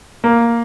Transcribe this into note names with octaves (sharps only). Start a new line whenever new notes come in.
A#3